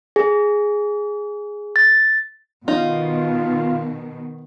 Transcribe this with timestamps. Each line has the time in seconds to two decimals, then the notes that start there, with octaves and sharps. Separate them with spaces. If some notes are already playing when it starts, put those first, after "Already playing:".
0.16 G#4
1.76 A6
2.68 B2 D#3 D#4 F4